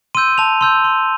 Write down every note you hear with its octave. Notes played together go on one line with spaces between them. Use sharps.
C6 E6 G6 D#7
A5 F7
C6 E6 G6
C6